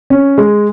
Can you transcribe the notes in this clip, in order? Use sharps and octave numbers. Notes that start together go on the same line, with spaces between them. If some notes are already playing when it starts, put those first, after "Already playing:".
C#4
G#3